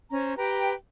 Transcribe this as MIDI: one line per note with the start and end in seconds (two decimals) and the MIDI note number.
0.11 0.37 61
0.11 0.37 72
0.11 0.37 82
0.37 0.72 67
0.37 0.72 71
0.37 0.72 79
0.37 0.72 82